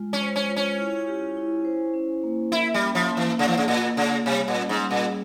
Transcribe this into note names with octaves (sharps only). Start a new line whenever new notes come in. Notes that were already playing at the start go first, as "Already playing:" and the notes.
Already playing: G#3 F4
C#4
C5
C#4
F4
C#4
E4
G4
E4
C5
C#4
A#3
E4 A#4
G3
C#4
F3
A#3
E3
C#3 A#3
E3
C#3
A#2 F4
C#3 A#3
C3 G3
A#2
C#4
G#2
G3
A#2